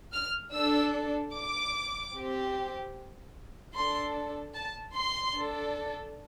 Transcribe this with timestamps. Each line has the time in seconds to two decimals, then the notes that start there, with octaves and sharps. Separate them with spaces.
0.13 F6
0.53 D4 A4 E6
1.33 D6
2.14 C4 G4
3.75 D4 A4 C6
4.54 A5
4.94 C6
5.35 D4 A4